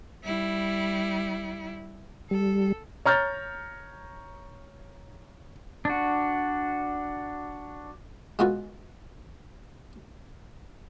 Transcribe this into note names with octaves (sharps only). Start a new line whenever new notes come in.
G3 E4
G3 A4
C#5 A#5 F6 G6 A6
D4 F#4
G#3 B3 F4 F#4 A4